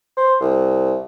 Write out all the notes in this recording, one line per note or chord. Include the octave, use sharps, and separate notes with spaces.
C5
C2